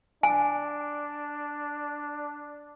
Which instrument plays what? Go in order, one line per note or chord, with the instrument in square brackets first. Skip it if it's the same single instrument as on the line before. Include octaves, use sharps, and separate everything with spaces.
[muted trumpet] D4 [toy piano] G#5